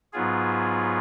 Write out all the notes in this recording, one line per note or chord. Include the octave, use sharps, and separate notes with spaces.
G#2 F#3 B3 F4 G#4